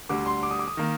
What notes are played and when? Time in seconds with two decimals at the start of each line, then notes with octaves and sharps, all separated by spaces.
0.09 D2 D3 G3 D6
0.26 C6
0.43 D6
0.51 D#6
0.59 D6
0.68 D#6
0.77 D#3 A#3